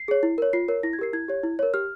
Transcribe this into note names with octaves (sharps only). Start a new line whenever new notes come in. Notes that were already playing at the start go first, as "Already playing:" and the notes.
Already playing: C7
G#4 C#5
E4
A#4 C#5
F4 C7
A#4 C#5
E4 A#6
G#6
G4 A#4 C7
E4 G#6
G4 C#5
E4
A#4 C#5
G4 F6